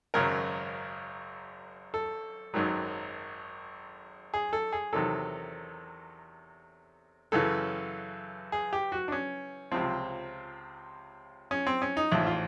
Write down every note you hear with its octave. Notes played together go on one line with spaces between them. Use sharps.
G#1 F#2 C#3 F#3 A#4
A4
G#1 F#2 D#3 F#3
G#4
A4
G#4
E2 C3 D#3 F#3 A4
F#2 C#3 E3 A4
G#4
G4
F#4
D4
C#4
C#2 C3 F3 C4
C#4
C4
C#4
D#4
A1 G#2 F3 E4
F4